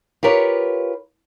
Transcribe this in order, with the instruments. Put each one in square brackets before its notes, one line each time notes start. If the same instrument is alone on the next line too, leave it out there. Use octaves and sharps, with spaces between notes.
[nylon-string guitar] F4 G4 A#4 B4 C#5